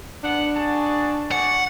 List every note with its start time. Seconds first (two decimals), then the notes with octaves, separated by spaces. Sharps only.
0.23 B3 D4 F#5
0.54 F#4 G#4 A5
1.32 F#4 G#4 D5 F#5